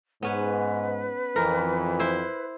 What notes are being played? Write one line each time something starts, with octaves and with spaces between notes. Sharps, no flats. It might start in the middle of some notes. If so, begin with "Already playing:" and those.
G#2 B3 C#4 B4
F2 E3 A#4
E4 C5